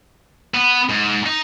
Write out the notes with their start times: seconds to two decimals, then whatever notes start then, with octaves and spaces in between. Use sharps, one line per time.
0.54 B3
0.89 G#2
1.26 D#4